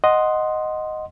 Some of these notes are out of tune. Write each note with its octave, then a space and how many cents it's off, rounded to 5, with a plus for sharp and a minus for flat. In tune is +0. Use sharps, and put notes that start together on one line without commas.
D#5 +0 F#5 +0 C6 +0